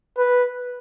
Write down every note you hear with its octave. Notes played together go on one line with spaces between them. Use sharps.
B4